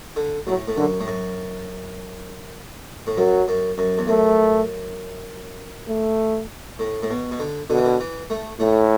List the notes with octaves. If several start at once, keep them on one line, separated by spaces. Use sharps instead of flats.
D3
A2 F#3
A2
F#2 D3
A2
F#2
A2
F#2 F#3
F#2
F#2
E2
F#2 A3
A3
A2
A2
B2
B2
D3
B2 D3
E3
D3
E3
A3
A2 A3